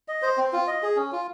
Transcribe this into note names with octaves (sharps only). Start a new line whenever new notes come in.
D#5
C5
C4
F4
D#5
G#4
C#4
F4